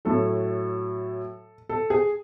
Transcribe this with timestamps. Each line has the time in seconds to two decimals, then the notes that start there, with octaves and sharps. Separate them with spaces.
0.05 A2 F#3 A4
1.69 A4
1.90 G#4